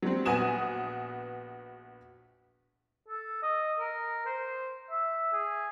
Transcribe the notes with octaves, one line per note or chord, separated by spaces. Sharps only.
F#3 G3 C4
A#1 B3 F#4 G#5 D#6 E7
A4
D#5
A#4
C5
E5
G#4